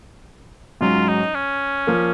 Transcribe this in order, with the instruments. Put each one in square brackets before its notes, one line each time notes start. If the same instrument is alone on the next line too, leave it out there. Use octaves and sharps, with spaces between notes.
[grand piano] G#2 F#3 C#4 [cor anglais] F4
[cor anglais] D#4
C#4
[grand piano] F3 A#3